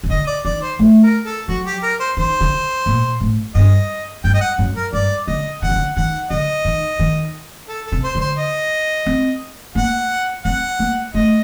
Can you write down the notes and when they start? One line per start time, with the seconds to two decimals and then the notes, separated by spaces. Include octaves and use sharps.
0.04 C3
0.10 D3 D#5
0.27 D5
0.45 D#3 D5
0.62 C5
0.79 A3
1.02 A#4
1.25 A4
1.48 F#3 F#4
1.65 G4
1.83 A#4
2.00 C5
2.17 D#3 C5
2.41 D3
2.86 A#2
3.21 A2
3.55 G2 D#5
4.24 G2 G5
4.34 D#5
4.41 F#5
4.58 F#2
4.76 A#4
4.93 G2 D5
5.27 D3 D#5
5.62 D3 F#5
5.69 D#3
5.76 D3
5.96 D#3 F#5
6.30 D3 D#5
6.65 D#3
6.99 D#3
7.69 A4
7.86 A4
7.92 C3
8.04 C5
8.15 D3
8.21 C5
8.38 D#5
9.06 C4
9.75 A#3 F#5
10.45 C4 F#5
10.79 A#3
11.14 A3 D#5